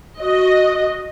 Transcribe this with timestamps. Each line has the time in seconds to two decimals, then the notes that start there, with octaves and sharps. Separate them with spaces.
0.19 F#4 D#5